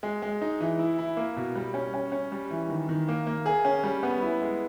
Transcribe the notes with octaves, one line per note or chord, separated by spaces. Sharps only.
G#3
G#3
D#4
E3
E4
E4
A#3
B2
G3
C#4
C#4
C#4
G3
E3
D#3
D#3
A#3
A#3
G#4
C#4
G3
B3
E4
G#3